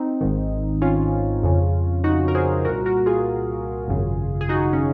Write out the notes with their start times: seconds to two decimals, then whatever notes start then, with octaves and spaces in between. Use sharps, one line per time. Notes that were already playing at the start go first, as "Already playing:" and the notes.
Already playing: C4 D#4
0.21 G#1 G#2 D#3
0.82 C#4 F4
1.43 F2 C#3
2.04 D#4 F#4
2.28 A#4
2.35 G#4 C5
2.65 C2 A#2 F#4 A#4
2.86 F#4 A#4
3.06 F4 G#4
3.88 G#1 F#2 C#3
4.41 G#4
4.49 D#4 F#4
4.73 C#4